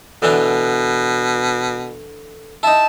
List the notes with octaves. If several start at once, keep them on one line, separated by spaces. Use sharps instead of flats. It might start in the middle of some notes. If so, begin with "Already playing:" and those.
B2 D3 E3 D4
D#4 E4 A5